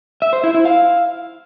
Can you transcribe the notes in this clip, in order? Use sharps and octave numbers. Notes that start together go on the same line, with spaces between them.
E5
C5
E4
E4
F5